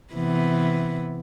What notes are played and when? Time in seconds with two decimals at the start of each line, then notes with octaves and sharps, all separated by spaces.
0.14 C3 E3 B3